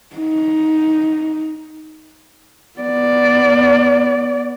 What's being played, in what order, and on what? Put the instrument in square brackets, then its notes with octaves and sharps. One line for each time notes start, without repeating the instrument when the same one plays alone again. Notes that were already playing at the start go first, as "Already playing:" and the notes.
[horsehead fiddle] D#4
B3 D5